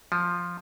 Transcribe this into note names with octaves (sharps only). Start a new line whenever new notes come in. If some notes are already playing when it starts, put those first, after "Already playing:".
F3